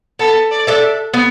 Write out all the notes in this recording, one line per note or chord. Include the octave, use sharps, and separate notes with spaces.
B3 A4
D5
D4 A4 E5
B3